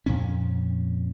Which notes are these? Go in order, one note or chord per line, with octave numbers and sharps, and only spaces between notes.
F2 A#2 C#4